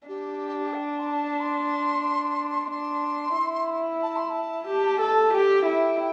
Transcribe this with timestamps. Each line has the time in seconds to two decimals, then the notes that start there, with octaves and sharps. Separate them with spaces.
0.08 D4 G4
0.74 G5
0.99 C6
1.07 A5
1.40 C6
2.71 D4 C6
3.37 E4
4.02 A5
4.16 C6
4.30 A5
4.68 G4
5.01 A4
5.27 A5
5.34 G4 G5
5.66 E4